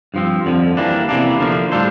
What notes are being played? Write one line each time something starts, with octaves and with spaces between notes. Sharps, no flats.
G2 F3 C4
F2 D3 F3
E3 G3 A#3 D4
E2 C3 E3 A#3 D4
D3 F3 A#3
A2 G3 D4 A4 C5